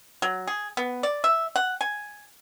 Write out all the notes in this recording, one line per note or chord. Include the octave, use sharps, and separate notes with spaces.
F#3
G#4
B3
D5
E5
F#5
G#5